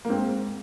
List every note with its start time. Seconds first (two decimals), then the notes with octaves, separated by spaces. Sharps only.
0.05 A#3
0.09 G#2 C4